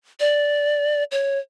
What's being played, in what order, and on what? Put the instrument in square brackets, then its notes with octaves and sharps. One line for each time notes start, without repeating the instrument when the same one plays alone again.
[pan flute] D5
C#5